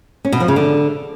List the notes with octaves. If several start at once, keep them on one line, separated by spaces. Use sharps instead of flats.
C#4
B2
F3
C#3
D3